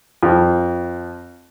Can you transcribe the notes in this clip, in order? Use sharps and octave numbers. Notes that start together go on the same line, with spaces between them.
F2